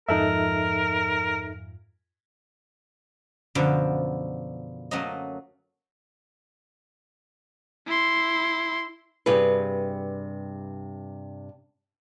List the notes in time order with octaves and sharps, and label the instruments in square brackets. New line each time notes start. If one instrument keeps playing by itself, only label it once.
[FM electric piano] F2 G#2 F3 [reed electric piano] D#4 A4 E5 [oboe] A#4
[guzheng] F#2 B2 D3 F3
F#3 A3 A#3 C#4 D#5
[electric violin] E4 C6
[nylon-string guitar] G2 C3 G3 G#4 B4